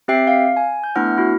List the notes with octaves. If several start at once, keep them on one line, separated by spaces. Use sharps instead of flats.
C4 G4 E5 G5 C7
F5
G#5
G6
A3 B3 D4 E4 F#5 F6
E4 F#4